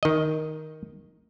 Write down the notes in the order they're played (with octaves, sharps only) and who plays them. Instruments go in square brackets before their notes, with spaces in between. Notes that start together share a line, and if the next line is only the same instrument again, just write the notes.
[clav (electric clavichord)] D#3 D#5